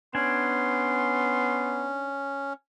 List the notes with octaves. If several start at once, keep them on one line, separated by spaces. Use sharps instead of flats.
B3 C#4 D4 G#5 C6